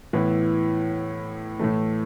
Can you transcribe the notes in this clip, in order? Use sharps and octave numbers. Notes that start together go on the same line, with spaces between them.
A2 E3 B3 E4
A2 E3 A3